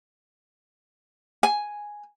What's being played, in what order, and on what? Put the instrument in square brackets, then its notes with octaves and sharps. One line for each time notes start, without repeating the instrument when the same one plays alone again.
[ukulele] G#5